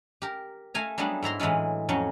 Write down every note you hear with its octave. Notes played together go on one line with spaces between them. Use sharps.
G4 A#4
A3 F5 G#5 A#5
F#3 G3 A3 B3 D4 G#4
G#2 E4 A#5 C6
A2 E3 F#3 G#3 F4
F2 F#3 C#4 D#4